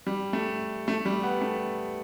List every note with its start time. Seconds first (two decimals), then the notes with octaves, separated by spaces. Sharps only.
0.06 G3
0.33 A3
0.88 A3
1.05 G3
1.23 B3
1.41 A3